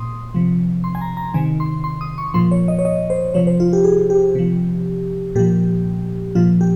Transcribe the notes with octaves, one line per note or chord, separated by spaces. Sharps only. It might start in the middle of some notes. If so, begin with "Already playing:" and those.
Already playing: A#2 C6 D#6
C3 F3
C6
G#5
A#5
A#5
C3 D#3 G#5
C6
C6
D#6
C#6
A#2 F3 C6
C#5
D#5
C#5
D#5
C5
C3 F3 C#5
C5
F4
G4
G#4
G4
C3 F3
A#2 F3 G4
A#2 F3 F4
G4